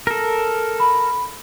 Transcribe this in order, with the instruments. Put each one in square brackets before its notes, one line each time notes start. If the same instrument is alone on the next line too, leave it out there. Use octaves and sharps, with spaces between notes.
[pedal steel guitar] A4 A#4
[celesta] B5